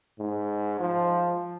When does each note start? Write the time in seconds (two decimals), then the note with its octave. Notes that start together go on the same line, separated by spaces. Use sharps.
0.19 G#2
0.80 F3